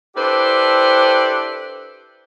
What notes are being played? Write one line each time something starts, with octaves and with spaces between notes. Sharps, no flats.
D4 E4 G4 A4 B4 C5